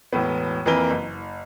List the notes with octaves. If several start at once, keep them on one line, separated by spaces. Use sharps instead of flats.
E1 A2 B3
F2 E3 A#3 A#4 B4 G7
F#1